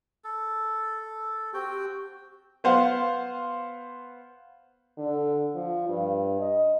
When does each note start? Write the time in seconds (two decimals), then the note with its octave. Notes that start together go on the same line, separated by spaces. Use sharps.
0.24 A4
1.54 C4 F#4 G4 G5
2.64 B3 C5 F5 F#5
4.98 D3
5.55 F3
5.89 G2
6.40 D#5